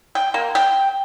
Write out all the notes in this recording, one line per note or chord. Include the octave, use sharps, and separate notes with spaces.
G5
A#3
G5